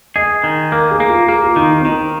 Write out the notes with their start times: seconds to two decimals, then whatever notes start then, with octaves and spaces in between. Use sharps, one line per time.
0.16 G#4 D#5
0.44 D#3
0.72 A#3 A#4
0.91 G#4
1.00 A#3
1.10 F4
1.28 A#3 G#4
1.43 F4
1.56 D#3 D#4
1.71 D#4
1.81 C4
1.85 D#3 D#4